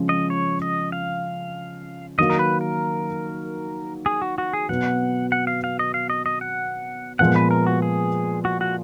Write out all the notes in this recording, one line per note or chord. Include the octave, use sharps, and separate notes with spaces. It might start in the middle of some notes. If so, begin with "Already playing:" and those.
Already playing: C#3 F3 G#3 C#4 F4
D#5
C#5
D#5
F5
D#3 F#3 A#3 D#5
A#4
B4
A#4
G#4
F#4
F#4
G#4
B2 F#3 B3 F#4 F#5
F#5
F5
F5
D#5
F5
D#5
D#5
F#5
A#2 F3 G#3 B3 F#5
B4
A#4
F#4
G#4
F#4
F#4